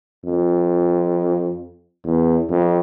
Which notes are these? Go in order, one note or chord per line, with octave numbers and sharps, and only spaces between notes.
F2
E2
F2